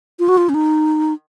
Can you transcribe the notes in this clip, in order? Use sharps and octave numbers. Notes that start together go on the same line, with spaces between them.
F4
F#4
F4
C#4
D#4